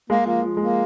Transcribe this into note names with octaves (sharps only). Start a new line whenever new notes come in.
G#3 A#3
F3 A#3
F3
G#3 A#3